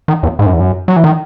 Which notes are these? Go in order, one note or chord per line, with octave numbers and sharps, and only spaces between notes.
D#3
E2
G#2
F#2
E2
F#2
F#3
E3
D#3